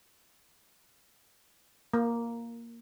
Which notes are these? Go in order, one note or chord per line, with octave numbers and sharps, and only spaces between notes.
A#3